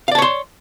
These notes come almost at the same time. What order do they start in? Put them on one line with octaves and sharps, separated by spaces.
F5 D5 A5 C#5 C6